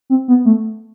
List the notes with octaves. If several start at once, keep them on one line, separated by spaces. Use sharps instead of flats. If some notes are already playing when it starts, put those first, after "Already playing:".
C4
B3
A3